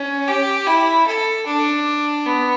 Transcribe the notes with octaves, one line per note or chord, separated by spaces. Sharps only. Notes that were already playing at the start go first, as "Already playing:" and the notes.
Already playing: C#4
G4
E4
A4
D4
B3